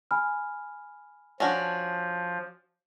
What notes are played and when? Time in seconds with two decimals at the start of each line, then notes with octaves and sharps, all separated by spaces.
0.11 G#5 B5 F6
1.40 F3 C#4 D4 F#4